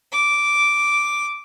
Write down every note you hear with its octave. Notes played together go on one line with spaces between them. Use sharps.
D6